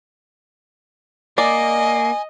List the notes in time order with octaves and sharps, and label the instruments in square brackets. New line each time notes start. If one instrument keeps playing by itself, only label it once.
[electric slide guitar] A#3 [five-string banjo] D5 [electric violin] D#5 [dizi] G#5